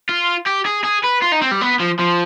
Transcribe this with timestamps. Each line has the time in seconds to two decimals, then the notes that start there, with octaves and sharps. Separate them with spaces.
0.09 F4
0.47 G4
0.66 G#4
0.85 G#4
1.04 B4
1.22 F4
1.32 D#4
1.42 C4
1.51 G3
1.61 B3
1.80 F3
1.99 F3